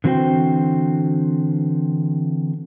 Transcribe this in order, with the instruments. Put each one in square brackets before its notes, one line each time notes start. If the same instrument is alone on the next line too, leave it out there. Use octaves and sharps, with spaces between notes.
[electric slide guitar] D3 E3 C4 F#4 C5 G5